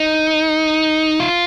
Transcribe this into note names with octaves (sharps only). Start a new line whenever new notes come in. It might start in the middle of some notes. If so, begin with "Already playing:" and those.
Already playing: D#4
F4